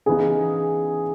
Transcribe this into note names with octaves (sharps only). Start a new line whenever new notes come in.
C#3 E3 B3 D#4 G#4